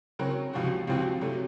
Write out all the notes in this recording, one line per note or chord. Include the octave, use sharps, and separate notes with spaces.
C#3 F#3 C4 F#4 A#4
C#2 C3 F3 C4 F#4
C#2 C3 F3 C4 F#4
C3 F#3 A3